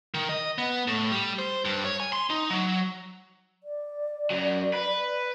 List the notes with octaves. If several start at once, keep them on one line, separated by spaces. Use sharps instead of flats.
D#3
D#5
B3
A2
G3
C5
G2
C#5
G#5
C6
D#4
F#3
D5
F#2 F#3
B4